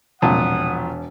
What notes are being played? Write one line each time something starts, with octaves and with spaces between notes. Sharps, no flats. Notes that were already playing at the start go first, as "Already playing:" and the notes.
E1 C2 A#2 F3 F4 F#5 A5 D#6